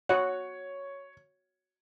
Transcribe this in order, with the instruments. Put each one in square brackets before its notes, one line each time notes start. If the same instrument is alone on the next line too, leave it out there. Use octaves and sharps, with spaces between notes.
[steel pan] F#4 F#5 [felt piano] C#5